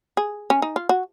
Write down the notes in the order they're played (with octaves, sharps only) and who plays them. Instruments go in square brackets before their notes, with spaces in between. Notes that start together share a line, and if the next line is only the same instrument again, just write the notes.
[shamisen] G#4
C#4
D#4
F4
F#4